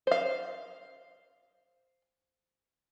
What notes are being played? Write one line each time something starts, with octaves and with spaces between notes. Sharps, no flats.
C5 F5